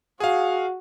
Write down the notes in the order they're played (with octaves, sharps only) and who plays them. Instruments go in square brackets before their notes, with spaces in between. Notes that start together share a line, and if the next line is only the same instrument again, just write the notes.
[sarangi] F#4 [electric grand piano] G#4 F5